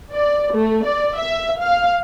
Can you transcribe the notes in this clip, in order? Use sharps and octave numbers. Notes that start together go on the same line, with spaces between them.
D5
A3
D5
E5
F5